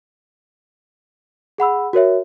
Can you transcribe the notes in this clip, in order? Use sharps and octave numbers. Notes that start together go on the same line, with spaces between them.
G#4 F#5 B5 E6
F#4 A#4 C#5 E5